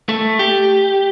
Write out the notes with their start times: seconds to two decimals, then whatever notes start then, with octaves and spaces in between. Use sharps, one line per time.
0.09 A3
0.39 G4